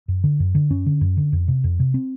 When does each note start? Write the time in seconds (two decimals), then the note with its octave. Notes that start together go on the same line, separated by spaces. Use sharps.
0.08 F#2
0.24 D3
0.40 F#2
0.55 D3
0.70 F#2 C#4
0.86 D3
1.01 F#2
1.17 D3
1.33 F2
1.48 C3
1.64 F2
1.80 C3
1.94 C4